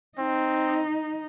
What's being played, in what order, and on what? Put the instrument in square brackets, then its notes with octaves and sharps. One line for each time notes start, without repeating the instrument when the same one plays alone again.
[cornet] C4 [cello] D#4